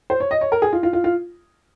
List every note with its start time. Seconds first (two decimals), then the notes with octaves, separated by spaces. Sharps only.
0.10 C5
0.20 C#5
0.31 D#5
0.41 C#5
0.52 A#4
0.62 G#4
0.73 F4
0.83 F4
0.93 F4
1.04 F4